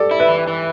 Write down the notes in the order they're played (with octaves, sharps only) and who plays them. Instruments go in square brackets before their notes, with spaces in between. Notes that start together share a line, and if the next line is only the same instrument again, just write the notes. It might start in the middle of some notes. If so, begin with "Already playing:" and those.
Already playing: [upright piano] G4 A4 D5
[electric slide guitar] E4
[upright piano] B4 E5
[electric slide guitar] E3
E3